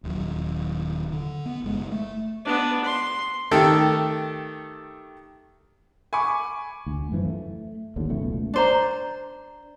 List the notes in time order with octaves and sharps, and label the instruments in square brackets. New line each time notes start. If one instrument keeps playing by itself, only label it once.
[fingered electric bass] D#1 D#2 F#3
D3
B3
F#1 G#3 A3
A3
[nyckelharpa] B3 D4
C6
[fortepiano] D#3 A3 G4 A4
[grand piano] G#5 B5 C#6 D6
[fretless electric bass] D2
F#2 E3 F3
A3
A1 D#2 A2 D3
F#1 C#2 B2 A3
[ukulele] D4 C5 A#5